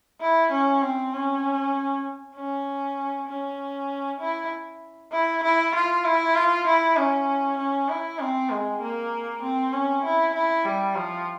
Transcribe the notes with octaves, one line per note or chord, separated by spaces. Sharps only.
E4
C#4
C4
C#4
C#4
C#4
E4
E4
E4
F4
E4
F4
E4
C#4
C#4
E4
C4
G#3
A#3
C4
C#4
E4
E4
G3
F3